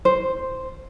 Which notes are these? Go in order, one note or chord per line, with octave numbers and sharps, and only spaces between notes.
C5